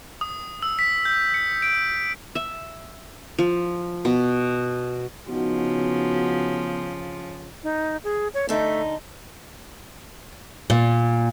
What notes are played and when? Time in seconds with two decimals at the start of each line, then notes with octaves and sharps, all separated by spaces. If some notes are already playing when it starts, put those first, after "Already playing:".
0.21 D#6
0.62 E6
0.79 B6
1.05 G6
1.34 C#7
1.62 D7
2.35 E5
3.39 F3
4.05 B2
5.30 C#3 F3 B3 D#4 F#4
7.63 D#4
8.04 G#4
8.34 C#5
8.49 D3 A3 D#4
10.70 A#2